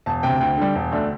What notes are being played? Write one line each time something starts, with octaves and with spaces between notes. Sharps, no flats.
E1 A5
D2 C3 G5
D2 G5
D3 G3
E1
D2 D3 A3 D4